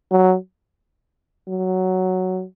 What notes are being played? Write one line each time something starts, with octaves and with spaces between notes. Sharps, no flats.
F#3
F#3